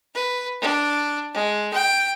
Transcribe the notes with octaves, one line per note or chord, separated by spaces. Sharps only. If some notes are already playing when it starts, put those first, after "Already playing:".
B4
D4
G#3
G5